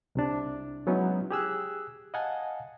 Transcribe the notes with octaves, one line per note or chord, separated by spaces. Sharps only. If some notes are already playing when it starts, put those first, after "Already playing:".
C2 C3 D4
F#3 G#3 B3 C#4 D#4 E4
G4 G#4 E6 F#6
D#5 F5 F#5 G#5 A5